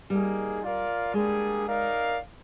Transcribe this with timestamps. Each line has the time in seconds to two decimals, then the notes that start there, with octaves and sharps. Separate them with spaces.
0.10 G3 A#3 D#4 G#4
0.63 F4 A#4 D5 F5
1.14 G3 G#3 A#3 D4 G#4
1.67 D#4 A#4 D5 F5